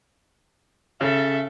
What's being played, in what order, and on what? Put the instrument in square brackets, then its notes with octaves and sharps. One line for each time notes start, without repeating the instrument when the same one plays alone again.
[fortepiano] C#3 [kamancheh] A4 E5